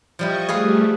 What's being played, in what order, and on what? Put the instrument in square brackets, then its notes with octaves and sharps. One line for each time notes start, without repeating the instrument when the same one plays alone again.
[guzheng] F3 G3 E4 [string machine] D#5 C#6
[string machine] G3 A3 [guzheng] G#4 B4 F5